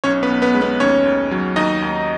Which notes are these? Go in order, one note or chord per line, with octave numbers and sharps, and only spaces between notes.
B1 C#4 C#5
B3 B4
B1
B3 B4
G#3
B3 B4
D#2 C#4 C#5
D#2
F#3
D#2 D#4 D#5
D#2